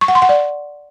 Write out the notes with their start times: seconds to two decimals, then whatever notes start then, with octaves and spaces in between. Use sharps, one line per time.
0.01 C#6
0.08 F#5
0.15 C6
0.22 F#5
0.29 D5